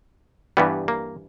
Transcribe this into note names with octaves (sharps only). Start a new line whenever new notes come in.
G2 E3 G3 B3
A#3